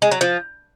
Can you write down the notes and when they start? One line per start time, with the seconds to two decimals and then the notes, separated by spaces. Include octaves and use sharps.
0.02 G#3
0.11 F#3
0.21 F3